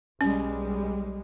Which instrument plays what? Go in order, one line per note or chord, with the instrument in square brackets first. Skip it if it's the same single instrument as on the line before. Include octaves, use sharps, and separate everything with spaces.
[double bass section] B1 G3 G#3 [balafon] C#4